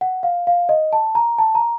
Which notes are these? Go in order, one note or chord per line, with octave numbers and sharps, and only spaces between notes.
F#5
F5
F5
D#5
A5
A#5
A5
A#5